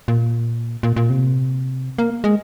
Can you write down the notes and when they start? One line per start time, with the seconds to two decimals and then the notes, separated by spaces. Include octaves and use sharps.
0.08 A#2
0.83 A#2
0.96 A#2
1.10 C3
1.98 A#3
2.24 G#3